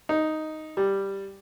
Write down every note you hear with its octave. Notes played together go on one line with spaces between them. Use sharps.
D#4
G3